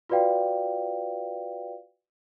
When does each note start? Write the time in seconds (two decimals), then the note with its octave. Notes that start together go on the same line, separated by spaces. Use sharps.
0.09 F4 F#4 B4 D5 F5 G5